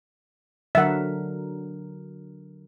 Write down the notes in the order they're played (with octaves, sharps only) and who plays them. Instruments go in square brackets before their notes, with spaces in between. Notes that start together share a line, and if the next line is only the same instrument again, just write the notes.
[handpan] D3 F#3 A#4 [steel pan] E5 F#5